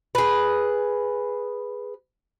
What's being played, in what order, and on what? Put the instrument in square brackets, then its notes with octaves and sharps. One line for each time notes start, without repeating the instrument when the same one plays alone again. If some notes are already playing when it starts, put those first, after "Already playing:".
[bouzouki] G#4 B4